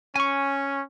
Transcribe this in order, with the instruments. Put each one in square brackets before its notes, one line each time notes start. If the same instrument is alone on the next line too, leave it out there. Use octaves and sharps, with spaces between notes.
[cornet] C#4 [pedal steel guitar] G#5 C#6